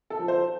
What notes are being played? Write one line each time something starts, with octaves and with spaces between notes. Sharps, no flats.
A4
F3
C5